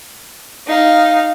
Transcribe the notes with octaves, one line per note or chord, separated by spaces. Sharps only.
D#4 F5